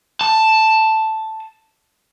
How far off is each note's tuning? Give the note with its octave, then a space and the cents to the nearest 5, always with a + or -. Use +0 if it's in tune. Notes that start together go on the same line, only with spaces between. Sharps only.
A5 +0